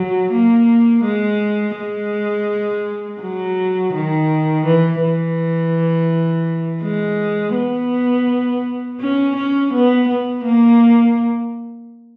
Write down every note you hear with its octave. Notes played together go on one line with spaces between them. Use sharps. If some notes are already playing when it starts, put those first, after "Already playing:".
Already playing: F#3
A#3
G#3
G#3
F#3
D#3
E3
E3
G#3
B3
C#4
C#4
B3
B3
A#3